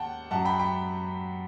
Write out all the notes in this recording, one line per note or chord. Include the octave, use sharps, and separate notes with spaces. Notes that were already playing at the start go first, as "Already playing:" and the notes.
Already playing: D#2 F#5 G5 A5
F#2 F#3 F#5 A5
G5 B5
G5 B5